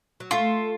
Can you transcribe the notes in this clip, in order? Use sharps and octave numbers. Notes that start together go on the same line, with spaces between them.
F#3
A3 F4